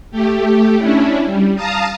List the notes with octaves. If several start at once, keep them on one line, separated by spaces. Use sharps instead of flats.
A3 G4
C#4 D4 E4
G3
F5 A5 A#5 D#6